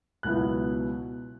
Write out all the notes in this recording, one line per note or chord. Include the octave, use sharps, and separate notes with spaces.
C#2 B2 F#3 B3 E4 F#6